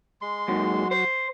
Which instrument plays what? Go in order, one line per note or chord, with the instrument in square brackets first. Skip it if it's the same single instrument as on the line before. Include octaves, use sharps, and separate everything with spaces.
[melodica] G#3 C6
[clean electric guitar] D#2 G#2 D#3 [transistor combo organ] F#3 F#4
[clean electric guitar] C5